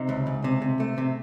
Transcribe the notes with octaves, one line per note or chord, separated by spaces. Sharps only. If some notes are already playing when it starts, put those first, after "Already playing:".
Already playing: C3 D#4
C#2
C#2
C3
C3
A3
C3